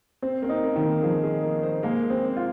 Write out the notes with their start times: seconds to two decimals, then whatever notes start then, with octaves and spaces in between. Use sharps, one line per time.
0.22 C4 C5
0.42 A#3 C4
0.49 D#4
0.64 A#3
0.76 D#3
0.83 A#3
1.03 F3 G#4
1.23 G#4
1.43 A#3
1.63 C5
1.83 G#3 A#3
2.03 G#3
2.10 C4
2.24 C5
2.36 F4